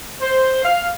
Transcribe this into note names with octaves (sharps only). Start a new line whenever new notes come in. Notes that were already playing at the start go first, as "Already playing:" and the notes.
C5
F5